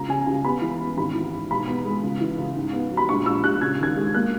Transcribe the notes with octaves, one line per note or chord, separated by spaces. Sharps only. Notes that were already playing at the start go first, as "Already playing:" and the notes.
Already playing: C#2 A#5
C#3 G#5
C#2 G#5
B3 B5
E3
B3
G#1 B5
E3
G#2
B1 B5
B3
G#3
C#2
E3
C#2
G#2
B3
F#3
B5
A#1 C#6
A#1 E6
A#1 F#6
C#3 G#6
D#2 G#6
G#3
A#3 F#6